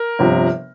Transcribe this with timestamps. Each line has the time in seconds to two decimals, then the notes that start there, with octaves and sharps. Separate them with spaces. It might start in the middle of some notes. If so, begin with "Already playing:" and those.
Already playing: A#4
0.19 G1 C3 F3